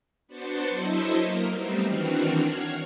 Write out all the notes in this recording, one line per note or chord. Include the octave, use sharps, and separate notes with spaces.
B3 D4 F#4 C5 A6 C#7
F#3 E4 A4 C5 D#5 E5
A#3 A#4
G3 A3 B3 C4 D#4 C5
D#3 E3 C4 D4 F#4 F6
C#5 F#5 F6 F#6 G#6 C7